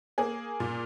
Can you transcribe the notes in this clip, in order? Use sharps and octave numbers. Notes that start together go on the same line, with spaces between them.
A#3 G#4
A#2